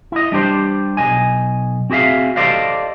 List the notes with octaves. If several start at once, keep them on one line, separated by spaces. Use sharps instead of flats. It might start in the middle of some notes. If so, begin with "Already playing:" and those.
E4 D#5
G3 D4 G4 C5
B1 D#5 G#5
C4 F#4 G#4 E5 F5
G4 A4 C5 D5 D#5 F5